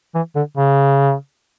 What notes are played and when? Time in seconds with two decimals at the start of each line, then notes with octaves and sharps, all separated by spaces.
0.15 E3
0.36 D3
0.57 C#3